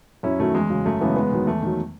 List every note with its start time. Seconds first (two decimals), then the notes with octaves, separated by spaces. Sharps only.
0.23 F#2 C#4 E4
0.39 D#3 F#3 A3
0.54 E2 G#3
0.70 C#3 F#3
0.86 F#2 A3
1.00 C#3 E3 G#3 B3
1.16 E2 G#3 B3
1.32 D#3 F#3
1.47 E2 A3
1.62 D#3 F#3